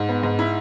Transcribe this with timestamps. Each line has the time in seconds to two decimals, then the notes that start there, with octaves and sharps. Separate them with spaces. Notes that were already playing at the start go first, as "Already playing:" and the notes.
Already playing: G#2
0.09 B3
0.23 G#2
0.39 E4